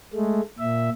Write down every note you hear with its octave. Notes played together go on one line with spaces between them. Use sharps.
G#3 A3
A#2 E5